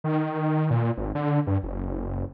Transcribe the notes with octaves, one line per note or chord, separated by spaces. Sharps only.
D#3
A#2
G#1
D3
G2
F#1